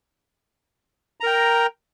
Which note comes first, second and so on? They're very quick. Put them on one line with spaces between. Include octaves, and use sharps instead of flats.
A#5 A#4 G5